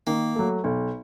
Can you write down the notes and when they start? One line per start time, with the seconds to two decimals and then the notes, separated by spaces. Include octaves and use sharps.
0.07 D#3 A#3
0.35 F#3 A3
0.64 B1